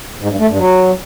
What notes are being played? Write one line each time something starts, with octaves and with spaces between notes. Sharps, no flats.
G#2
G2
A3
G2
F#3